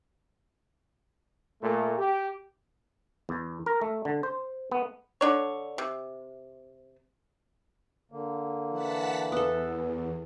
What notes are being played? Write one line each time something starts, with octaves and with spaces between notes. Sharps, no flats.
A#2 A3
G4
E2
A#4
A3
D3
C5
B3
D3 D4 C#5
C3
D3 A#3
E3 F#5 A5 B6
E2 B3 A4